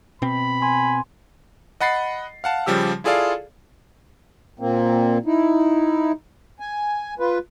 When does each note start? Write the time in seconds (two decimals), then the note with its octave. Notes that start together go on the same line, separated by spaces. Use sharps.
0.22 B2 C4 B5
0.62 G#5 C6
1.80 D#5 F#5 B5 A6 C7
2.44 F5 F#5 A5
2.66 C#3 F3 G3 G4 E6
3.04 E4 F4 G#4 A4 D5 F5
4.60 A#2 A#3 C4
5.26 D#4 E4
6.60 G#5
7.20 F4 B4